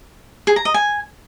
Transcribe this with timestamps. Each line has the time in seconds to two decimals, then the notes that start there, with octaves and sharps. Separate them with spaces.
0.47 G#4
0.56 A#5
0.65 D#5
0.74 G#5